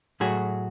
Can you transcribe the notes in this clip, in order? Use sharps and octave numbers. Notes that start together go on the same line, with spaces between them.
A2 F#3 A3 F#4 G#4